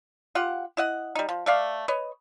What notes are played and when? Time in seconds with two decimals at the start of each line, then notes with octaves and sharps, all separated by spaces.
0.35 F4 G4 F#5
0.77 E4 D#5 F#5
1.15 G3 D#4
1.29 F3
1.46 A3 D5 F5
1.88 B4 C#5 D#5